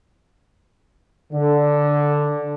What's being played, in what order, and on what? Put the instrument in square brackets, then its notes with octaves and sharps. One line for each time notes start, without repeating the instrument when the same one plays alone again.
[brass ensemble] D3